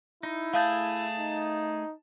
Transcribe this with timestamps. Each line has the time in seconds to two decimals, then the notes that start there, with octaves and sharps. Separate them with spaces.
0.23 D#4 E4
0.54 A3 G#4 F5 A5 G6
1.17 D#4